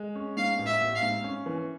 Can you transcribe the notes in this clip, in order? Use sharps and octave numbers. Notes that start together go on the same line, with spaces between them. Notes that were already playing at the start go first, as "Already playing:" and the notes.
Already playing: G#3
C#4
G#2 F5
A1
E5
A1
F5
G#2
C#4
E3